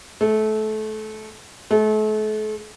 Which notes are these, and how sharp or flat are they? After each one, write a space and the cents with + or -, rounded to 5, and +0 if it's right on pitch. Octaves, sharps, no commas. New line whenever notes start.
A3 -25
A3 -40